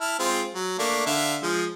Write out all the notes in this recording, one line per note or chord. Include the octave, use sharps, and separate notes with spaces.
E4 A5 F6
G#3 C4 F4
F#3
A3 A#3 D4
D3 E5 F5
F3 G#3